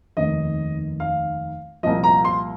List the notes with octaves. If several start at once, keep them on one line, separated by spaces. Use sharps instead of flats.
F1 D#2 D#3 D#5
F5
C2 A#2 F3 D#5
A#5
C6